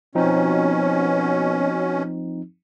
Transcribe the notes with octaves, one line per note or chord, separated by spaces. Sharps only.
B2 F3 C4 C#4 D#4